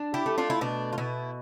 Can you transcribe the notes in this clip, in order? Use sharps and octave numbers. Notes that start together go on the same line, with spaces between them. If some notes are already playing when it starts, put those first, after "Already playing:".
Already playing: D4
E4 G4
A3
D4 F4
E4
B2 D4
F4
B2 E4